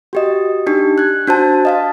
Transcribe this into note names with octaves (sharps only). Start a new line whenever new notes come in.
F#4 G4 D#5
D4 D#4 G4
F#6 G#6
D4 F#4 C5 A5
D#5 F5 A5